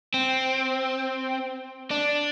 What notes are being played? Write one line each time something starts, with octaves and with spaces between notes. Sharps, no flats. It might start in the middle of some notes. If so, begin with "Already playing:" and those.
C4
D4